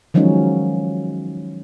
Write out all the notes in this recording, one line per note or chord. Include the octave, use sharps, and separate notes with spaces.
D#3 F3 F#3 G#3 C#4 D#4